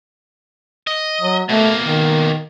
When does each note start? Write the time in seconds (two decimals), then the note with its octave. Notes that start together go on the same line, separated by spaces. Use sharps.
0.87 D#5
1.21 F#3
1.49 B2 A3 A#3
1.84 D#3